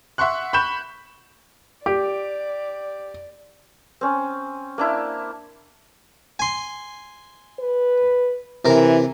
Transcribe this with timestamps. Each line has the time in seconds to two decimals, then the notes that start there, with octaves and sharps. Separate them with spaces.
0.18 E5 F#5 C6 C#6 F#6
0.53 B5 C#6 G6 E7
1.86 G4 D5
4.01 C4 C#4
4.78 A#3 D4 E4
6.39 G#5 C6
7.59 B4
8.65 C3 E3 A#4